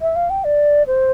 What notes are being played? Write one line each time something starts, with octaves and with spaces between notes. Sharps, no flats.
E5
F5
G5
D5
C5